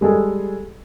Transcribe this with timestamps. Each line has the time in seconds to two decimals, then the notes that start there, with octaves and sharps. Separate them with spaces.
0.01 G3 G#3 G#4 A4